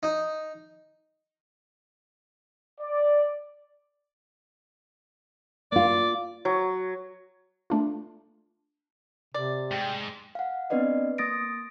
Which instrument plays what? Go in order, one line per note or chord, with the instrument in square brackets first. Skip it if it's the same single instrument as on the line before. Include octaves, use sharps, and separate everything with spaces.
[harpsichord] D#4
[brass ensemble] D5
[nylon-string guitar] A#3 F4 [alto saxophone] D5
[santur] F#3
[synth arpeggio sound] A3 D4 F4
[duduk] C3 [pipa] D5
[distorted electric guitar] G#2 [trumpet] G5
[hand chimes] F5 F#5
B3 C4 D4 B4 D5 D#5
A#3 D#6 A6 A#6 D7